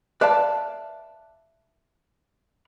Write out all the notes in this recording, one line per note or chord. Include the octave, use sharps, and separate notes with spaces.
B4 D5 E5 F5 A5